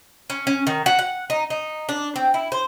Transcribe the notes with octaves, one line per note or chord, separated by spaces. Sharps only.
C#4
C#4
D#3
F#4
F#5
D#4
D#4
D4
C4
E4
C5